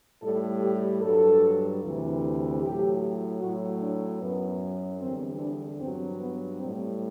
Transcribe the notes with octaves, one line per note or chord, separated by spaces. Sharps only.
A2 G3 A4
G4
G2 F#3 A4
D2 C3 E3
A2 F#3 G4
A2 F#3 F#4
D4
F#2 F#3 B3
E2 D3 G3 C4
D4
G2 F#3 C4
B3
A2 G3 C4